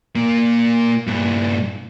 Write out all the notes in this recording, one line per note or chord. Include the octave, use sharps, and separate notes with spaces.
A#2 A#3
G2 A#2